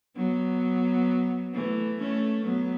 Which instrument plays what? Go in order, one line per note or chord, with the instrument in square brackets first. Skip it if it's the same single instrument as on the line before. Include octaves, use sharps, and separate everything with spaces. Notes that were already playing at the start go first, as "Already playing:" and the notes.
[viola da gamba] F#3 B3
E3 A3
A3 C#4
F#3 B3